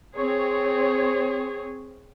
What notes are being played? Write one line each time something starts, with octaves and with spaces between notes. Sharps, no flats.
C4 G#4 C#5